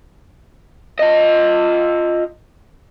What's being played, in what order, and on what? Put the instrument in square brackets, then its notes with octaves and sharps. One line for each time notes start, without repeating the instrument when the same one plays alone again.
[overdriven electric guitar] F4 D#5